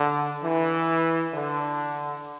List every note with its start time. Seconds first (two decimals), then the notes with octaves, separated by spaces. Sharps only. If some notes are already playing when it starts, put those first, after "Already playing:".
Already playing: D3
0.42 E3
1.34 D3